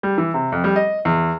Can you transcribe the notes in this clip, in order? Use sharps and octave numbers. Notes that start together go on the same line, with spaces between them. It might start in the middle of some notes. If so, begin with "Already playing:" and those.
G3
E3
C3
F2
G3
D#5
E2